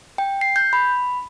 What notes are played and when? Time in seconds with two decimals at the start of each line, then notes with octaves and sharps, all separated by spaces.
0.18 G5
0.41 C7
0.56 G6
0.73 B5